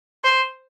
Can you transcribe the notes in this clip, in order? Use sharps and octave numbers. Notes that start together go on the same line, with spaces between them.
C5